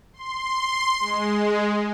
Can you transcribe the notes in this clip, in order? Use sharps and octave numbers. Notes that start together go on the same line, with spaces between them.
C6
G#3